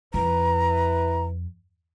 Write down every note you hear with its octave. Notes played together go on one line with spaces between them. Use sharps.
F2 E4 B4 A#5